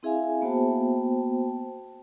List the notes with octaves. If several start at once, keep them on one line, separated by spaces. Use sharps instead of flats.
C4 E4 G#4 E5 F5 G#5
A#3 B3 F#4 C5 G5 A5